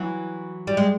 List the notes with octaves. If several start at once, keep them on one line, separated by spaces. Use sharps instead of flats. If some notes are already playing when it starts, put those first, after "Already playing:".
Already playing: E3 F#3
G3
G#3